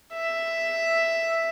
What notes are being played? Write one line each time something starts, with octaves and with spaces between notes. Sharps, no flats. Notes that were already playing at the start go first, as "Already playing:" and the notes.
E5